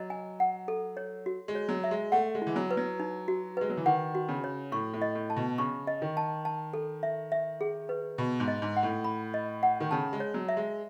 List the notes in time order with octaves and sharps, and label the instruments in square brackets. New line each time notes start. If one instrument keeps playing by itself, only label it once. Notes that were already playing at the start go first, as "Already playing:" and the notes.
Already playing: [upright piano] F#3 [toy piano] D#5
[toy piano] G#5
F#5
A4
C#5
F#4
[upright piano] G#3
[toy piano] C#5
[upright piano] F#3
[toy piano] E5
[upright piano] G#3
[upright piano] A3 [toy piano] F#5
[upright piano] G#3
[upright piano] E3 [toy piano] E4
[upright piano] F#3
[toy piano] B4
[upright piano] F#3
[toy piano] D#4
F#4
[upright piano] G#3 [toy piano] B4
[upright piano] F#3
E3
[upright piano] D#3 [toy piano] F#5
[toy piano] F#4
[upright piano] C#3
[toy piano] C#5
[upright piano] A2 [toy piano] C#6
[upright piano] A2
[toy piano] D#5
[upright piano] A2
[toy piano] A5
[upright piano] B2
[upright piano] C#3 [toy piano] C#6
[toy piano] D#5
[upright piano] D#3
[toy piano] A5
A5
A4
E5
E5
G#4
B4
[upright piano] B2 [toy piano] B5
[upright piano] G#2
[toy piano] D#5
[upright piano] G#2
[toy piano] F#5
[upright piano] A2
[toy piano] B5
D#5
F#5
[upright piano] D#3
[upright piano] C#3 [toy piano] A5
[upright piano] G#3
[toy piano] C#5
[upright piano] F#3
[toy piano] E5
[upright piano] G#3